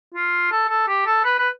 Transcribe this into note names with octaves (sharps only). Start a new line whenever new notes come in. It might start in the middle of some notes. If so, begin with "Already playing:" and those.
F4
A4
A4
G4
A4
B4
B4